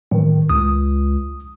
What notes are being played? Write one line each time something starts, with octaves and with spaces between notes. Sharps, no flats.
A2 D#3
C#2 D#6